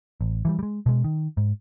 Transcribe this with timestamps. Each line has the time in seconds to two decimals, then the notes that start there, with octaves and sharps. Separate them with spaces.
0.21 A1
0.45 E3 F#3 G3
0.59 G3 G#3
0.86 B2 G#3
1.04 D#3
1.37 G#2